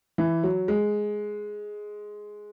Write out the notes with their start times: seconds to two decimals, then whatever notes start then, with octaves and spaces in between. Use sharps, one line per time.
0.18 E3
0.44 F#3
0.68 G#3